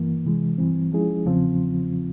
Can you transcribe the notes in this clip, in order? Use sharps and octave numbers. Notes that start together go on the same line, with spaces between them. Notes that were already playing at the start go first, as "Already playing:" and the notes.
Already playing: G2 E3 A#3
C3 E3 G#3
G2 E3 G3 C4
F3 G#3 C#4 E4 G#4
E2 C#3 F3 C4 F4